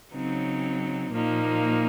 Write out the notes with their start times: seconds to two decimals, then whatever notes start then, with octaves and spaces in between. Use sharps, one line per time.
0.12 C#3 F#3 C4 D#4
1.11 A#2 F3 A#3 D#4